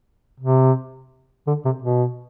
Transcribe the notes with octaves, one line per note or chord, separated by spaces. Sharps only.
C3
D3
C3
B2